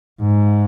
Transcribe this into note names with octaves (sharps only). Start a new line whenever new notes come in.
G#2